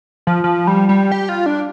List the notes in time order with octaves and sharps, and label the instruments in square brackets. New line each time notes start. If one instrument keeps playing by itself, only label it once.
[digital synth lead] F3
F3
G3
G3
G4
F4
D4